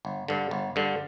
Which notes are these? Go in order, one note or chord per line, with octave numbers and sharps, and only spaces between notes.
G1
G2 D3
G1
G2 D3